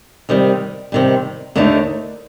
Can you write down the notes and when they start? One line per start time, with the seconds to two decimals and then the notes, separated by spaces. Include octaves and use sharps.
0.29 C3 D#3 G3
0.92 C3 D#3 G3
1.56 D#2 D3 A3 D#4